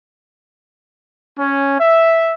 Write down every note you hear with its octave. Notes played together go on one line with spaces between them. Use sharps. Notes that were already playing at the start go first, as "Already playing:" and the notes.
C#4
E5